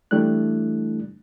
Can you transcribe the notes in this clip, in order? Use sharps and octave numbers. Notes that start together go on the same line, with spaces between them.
E3 G3 A3 D4 E4 F#6